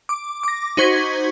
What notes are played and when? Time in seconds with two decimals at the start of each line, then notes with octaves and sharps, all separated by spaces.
0.09 D6
0.43 D6 A#6
0.77 D#4 F#4 C5 C#6 G#6 B6